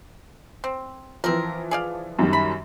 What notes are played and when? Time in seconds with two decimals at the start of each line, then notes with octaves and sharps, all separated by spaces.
0.64 C4
1.24 E3 F3 C4 A#4
1.71 G#4 D5 F5
2.19 F#2 D#3 G3
2.33 B5